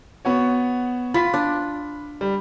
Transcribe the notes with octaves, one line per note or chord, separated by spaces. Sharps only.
B3 F#4 C#5
F4 B5 B6
D4
G3